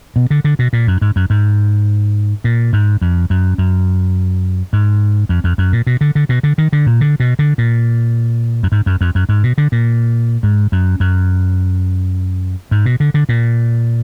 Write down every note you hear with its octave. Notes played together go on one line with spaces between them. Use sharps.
B2
D3
D3
B2
A#2
F#2
G#2
F#2
G#2
A#2
G#2
F2
F#2
F#2
G#2
F2
F2
F#2
A#2
B2
D3
D3
B2
D3
D#3
D3
A#2
D3
B2
D3
A#2
F#2
G#2
F#2
F2
F#2
G#2
B2
D3
A#2
G#2
F#2
F#2
G#2
B2
D3
D3
A#2